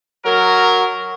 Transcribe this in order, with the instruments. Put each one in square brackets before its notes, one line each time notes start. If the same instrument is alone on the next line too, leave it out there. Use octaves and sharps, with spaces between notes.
[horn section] F#3 A#4